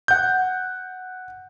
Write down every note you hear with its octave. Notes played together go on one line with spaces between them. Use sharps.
F#5 G6